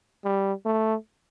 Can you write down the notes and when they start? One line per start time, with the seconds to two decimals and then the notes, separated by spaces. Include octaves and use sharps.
0.24 G3
0.66 A3